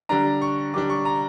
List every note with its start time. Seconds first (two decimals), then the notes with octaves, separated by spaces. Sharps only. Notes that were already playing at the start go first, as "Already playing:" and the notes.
0.09 D3 G3 D4 A#5
0.42 C#6
0.74 D3 G3 D4 D6
0.90 C#6
1.05 A#5